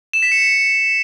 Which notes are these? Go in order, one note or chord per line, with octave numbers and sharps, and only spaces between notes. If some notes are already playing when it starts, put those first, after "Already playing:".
E7
B6
C#7